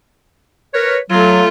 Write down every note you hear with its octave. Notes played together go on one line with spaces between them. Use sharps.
A#4 B4 C#5
F#3 A3 F4